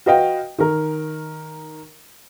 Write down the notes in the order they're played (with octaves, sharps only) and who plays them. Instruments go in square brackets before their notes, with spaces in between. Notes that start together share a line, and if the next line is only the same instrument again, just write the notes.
[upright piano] F#4 B4 D#5 F5 G5
D#3 A#4